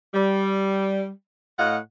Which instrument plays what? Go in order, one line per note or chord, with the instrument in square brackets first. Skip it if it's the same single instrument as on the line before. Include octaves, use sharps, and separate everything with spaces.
[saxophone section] G3
A2 D#5 F5 F#5